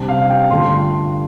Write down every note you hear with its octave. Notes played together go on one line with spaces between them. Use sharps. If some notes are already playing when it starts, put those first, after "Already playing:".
Already playing: C3 G3 D4
F5
G5
G2 D3 A3 D4 F4 C6